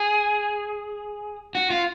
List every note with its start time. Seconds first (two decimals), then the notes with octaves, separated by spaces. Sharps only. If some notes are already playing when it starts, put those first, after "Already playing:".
Already playing: G#4
1.55 F#4
1.70 F4